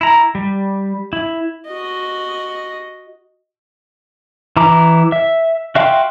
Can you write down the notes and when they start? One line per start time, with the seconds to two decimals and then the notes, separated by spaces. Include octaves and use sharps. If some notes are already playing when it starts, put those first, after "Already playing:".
0.01 E4 A#5
0.35 G3
1.13 E4
1.67 F#4 D#5
4.57 E3 E4 A#5 D6
5.12 E5
5.75 F#4 E5 F5 G5 C6